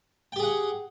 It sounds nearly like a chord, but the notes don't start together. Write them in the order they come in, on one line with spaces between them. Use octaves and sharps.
G5 G4 G#4 F#5